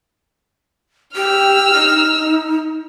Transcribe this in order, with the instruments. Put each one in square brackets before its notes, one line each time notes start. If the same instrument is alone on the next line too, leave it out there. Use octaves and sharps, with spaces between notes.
[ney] G4 [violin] E6 F6
[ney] D#4